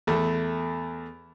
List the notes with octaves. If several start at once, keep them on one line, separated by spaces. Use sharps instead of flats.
E2 A3